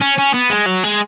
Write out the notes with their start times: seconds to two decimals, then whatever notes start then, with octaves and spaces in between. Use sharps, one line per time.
0.02 C#4
0.18 C#4
0.34 B3
0.50 G#3
0.66 F#3
0.84 G#3